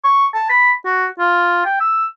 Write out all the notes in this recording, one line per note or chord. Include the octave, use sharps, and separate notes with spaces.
C#6
A5
B5
F#4
F4
G5
E6